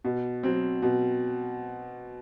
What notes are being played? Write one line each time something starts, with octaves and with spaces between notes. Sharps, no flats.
B2
F#3 C4
B2